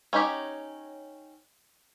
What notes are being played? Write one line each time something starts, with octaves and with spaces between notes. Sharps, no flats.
C#4 D#4 E4 G4 C#5